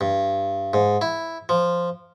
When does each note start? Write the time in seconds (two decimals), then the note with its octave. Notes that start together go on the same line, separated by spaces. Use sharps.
0.01 G2
0.73 G#2
1.01 E4
1.49 F3